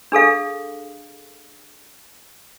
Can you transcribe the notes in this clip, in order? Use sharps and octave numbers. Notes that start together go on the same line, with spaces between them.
D4 G#4 A4 F5